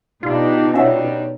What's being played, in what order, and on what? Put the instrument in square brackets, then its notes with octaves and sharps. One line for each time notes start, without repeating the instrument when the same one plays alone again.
[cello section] B2 D#4 [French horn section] D4 G4 [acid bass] F4
[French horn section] G2 G3 C#5 [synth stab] C#4 F#4 E5